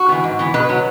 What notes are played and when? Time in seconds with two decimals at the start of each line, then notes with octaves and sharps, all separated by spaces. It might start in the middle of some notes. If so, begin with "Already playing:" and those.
Already playing: F#4
0.09 E3 B3
0.24 G#2
0.39 E3 B3
0.54 B2 B4
0.69 F#3 B3